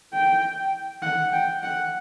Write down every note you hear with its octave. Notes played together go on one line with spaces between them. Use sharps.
G5
F#5
G5
F#5